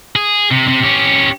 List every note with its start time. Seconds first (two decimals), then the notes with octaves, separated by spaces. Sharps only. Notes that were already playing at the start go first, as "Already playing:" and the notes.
0.16 G#4
0.51 C3
0.68 C3
0.84 C#4 G4